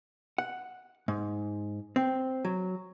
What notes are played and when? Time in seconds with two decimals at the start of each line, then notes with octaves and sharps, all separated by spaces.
0.38 F#5
1.08 G#2
1.96 C4
2.45 F#3